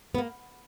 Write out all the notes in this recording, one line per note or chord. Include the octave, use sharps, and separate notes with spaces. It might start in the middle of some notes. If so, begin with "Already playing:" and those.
B3
A#3